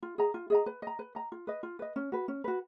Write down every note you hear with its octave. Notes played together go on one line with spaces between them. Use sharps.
F4
G#4 D#5 A#5
F4
G#4 D#5 A#5
B4
D#5 A#5
B4
D#5 A#5
F4
B4 D#5
F4
B4 D#5
C#4
F#4 B4
C#4
F#4 B4